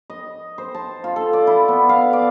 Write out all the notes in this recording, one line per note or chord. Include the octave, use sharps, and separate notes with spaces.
D#5
C5
A5
F4
A4
D5
E4
B3
F5
D5